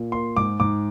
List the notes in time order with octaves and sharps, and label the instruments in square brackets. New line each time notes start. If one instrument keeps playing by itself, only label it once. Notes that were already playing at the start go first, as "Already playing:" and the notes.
Already playing: [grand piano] A#2
A#3 C6
G#2 D6
G#2 D6